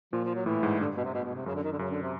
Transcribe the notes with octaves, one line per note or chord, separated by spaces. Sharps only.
A#2 F3
F3
F#3
A2 E3
G#2
G2 D3
B2
C3
B2
B2
C3
F#2 C#3
D3
D#3
D3
F#2 C#3
D3
C3